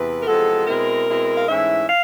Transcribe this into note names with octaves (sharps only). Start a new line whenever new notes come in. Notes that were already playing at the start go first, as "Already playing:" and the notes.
Already playing: E2 C3 B4
A#4
E2 C3 F3 G#3 B3 A4
B2 G#3 C4 E4 A#4
B2 G#3 C4 E4
F5
G#2 E3 A3 C#4 E4 E5
F5